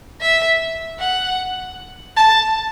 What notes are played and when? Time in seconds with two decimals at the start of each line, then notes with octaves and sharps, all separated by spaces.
0.21 E5
0.99 F#5
2.17 A5